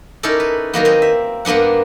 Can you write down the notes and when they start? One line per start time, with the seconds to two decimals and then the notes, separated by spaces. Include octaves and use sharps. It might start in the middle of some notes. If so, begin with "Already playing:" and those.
0.23 C#4 D#4 E4 A4 A#4 D5
0.40 B4
0.74 D#3 F#3 A#3 B3
0.85 C4 D#5
1.02 E5
1.45 G2 A#3 B3 D4 F#5